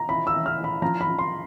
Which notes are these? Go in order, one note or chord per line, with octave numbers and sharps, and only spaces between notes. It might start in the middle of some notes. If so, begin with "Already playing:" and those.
Already playing: A#5
E3 B5
E6
E3
F6
E3
B5
F3 A#5
B5
F3
C6